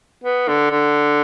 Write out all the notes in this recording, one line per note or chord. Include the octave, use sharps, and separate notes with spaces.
B3
D3
D3